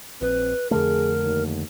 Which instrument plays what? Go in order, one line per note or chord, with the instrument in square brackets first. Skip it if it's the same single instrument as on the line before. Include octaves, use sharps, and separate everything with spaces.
[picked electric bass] A#1 [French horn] C4 [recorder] B4
[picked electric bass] F2 D3 A3 [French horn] G#4 [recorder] A#4
[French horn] D#2